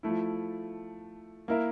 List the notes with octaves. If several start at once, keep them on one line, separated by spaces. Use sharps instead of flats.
F3 A3 E4
A#3 E4 A#4 E5